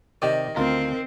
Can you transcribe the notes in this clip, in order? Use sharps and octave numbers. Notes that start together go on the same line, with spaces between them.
C3 D#3 G4 D5 D#5
D2 C4 F4 A#4 A#5